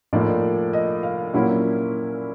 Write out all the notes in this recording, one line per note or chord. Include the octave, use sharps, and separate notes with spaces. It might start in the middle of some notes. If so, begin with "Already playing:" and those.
A2 F3 A#3 D#4 D5
D#5
F5
A#2 F#3 A#3 C#4 E4